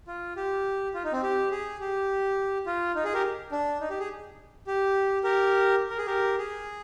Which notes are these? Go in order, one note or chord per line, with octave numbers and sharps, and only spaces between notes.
F4
G4
F4
D#4
C4
G4
G#4
G4
F4
D#4
G#4
G4 A#4
D4
D#4
G4
G#4
G4
G4 A#4
A#4
G#4
G4 A#4
G#4